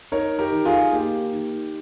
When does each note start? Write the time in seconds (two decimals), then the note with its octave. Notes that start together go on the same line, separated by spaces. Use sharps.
0.12 D#4 A#4 C#5
0.39 G4 A#4
0.52 D#3
0.65 F4 G#4
0.92 A#3 G4
1.33 D#3